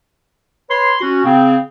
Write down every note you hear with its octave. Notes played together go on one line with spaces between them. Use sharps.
B4 C#5 C6
C#4 F#4
C#3 C4